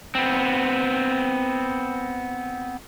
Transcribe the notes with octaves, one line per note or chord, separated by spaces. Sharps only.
B3 C4